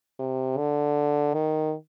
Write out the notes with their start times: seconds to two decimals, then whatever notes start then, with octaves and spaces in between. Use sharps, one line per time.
0.19 C3
0.57 D3
1.34 D#3